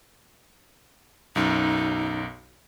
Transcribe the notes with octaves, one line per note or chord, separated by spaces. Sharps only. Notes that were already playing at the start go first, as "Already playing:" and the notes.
B1 F#2 D#4